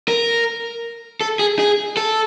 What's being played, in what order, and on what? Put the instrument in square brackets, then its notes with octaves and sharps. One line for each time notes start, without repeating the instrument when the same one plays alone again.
[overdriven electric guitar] A#4
A4
G#4
G#4
A4